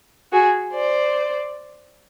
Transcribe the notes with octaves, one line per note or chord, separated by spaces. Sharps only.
F#4 G#4
C5 D5